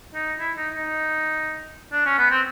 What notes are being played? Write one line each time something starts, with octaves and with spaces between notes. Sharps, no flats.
D#4
E4
D#4
D#4
D4
C#4
B3
C4